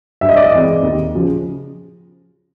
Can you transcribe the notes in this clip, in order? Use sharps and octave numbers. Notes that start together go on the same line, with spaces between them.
G2 E5
D#5
D5
D#5
E3 G#3 C4
D#2
C#3 F3